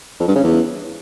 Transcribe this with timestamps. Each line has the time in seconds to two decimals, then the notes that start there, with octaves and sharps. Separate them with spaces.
0.20 F2
0.28 G2
0.35 C#3
0.43 E2